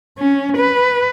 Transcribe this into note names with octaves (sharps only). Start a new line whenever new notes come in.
C#4
B4